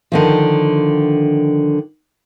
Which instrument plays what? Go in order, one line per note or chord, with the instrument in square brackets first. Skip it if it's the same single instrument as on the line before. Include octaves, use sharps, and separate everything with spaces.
[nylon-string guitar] D3 D#3 F3